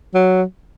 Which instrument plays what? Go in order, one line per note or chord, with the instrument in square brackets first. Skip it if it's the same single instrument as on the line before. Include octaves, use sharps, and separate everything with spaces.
[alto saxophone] F#3